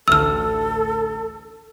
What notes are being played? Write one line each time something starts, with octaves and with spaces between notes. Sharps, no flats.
A1 D2 A4 E6 F6